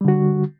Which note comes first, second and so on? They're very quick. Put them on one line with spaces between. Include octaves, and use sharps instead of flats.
G3 D3 F#4